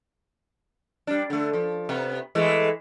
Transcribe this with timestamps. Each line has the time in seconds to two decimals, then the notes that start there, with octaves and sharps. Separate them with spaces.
1.07 G3 D4
1.30 D3 A3
1.53 F3
1.89 C3 B3
2.35 E3 G#3 A3